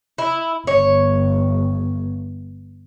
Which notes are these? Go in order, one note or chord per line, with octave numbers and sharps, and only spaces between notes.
E4
G1 C#5